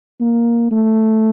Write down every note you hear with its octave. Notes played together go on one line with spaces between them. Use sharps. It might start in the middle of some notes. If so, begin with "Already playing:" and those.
A#3
A3